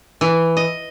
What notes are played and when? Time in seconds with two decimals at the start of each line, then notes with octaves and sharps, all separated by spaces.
0.21 E3
0.57 D#5